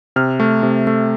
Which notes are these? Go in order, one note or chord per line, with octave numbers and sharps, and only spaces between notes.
C3 F6
A3
C3
A3